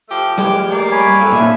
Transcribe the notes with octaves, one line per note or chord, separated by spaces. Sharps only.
F3 A3 G4
E3 F3 G3 G4 G#4
A#3 D#4 D5
C#5 G#5 B5
F2
A#2 F3 D4 G#4 E5